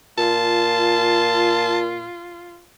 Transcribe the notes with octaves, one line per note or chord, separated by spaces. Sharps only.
A#2 F4 A5